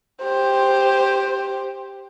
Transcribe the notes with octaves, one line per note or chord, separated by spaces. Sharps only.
G4 C5